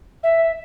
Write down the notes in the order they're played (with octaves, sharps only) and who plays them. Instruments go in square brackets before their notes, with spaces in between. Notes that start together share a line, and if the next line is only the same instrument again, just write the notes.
[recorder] E5